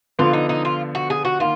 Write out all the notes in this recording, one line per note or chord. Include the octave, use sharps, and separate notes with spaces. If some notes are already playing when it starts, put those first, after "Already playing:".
D3 F3 B3 F4
D#4
D#4
F4
F#4
G#4
F#4
D#3 A#3 F4